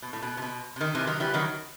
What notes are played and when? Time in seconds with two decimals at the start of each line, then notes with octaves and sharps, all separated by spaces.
0.02 B2
0.13 A2
0.22 B2
0.37 C3
0.42 B2
0.76 C3
0.81 D#3
0.95 C3 E3
1.07 D#3 F#3
1.20 E3 G3
1.34 D#3 F#3